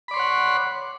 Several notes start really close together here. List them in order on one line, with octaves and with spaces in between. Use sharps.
B5 D5 C6 C#5 F#5